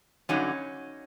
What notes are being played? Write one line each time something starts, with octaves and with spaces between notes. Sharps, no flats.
G2 D3 F#3 C#4 D#4